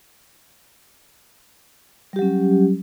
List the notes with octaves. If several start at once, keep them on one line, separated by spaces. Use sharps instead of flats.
F#3 G3 C#4 G4